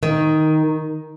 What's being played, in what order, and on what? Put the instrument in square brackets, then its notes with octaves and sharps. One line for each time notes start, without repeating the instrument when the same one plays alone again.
[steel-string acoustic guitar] D#3